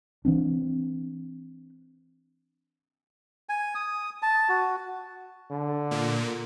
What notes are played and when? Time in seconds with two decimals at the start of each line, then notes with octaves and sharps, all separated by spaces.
0.25 E3 C4 D4
3.49 G#5
3.75 D#6
4.22 A5
4.49 F#4
5.51 D3
5.91 A#2